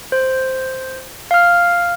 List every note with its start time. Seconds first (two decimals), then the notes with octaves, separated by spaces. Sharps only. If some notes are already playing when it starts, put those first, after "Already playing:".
0.12 C5
1.31 F5 F6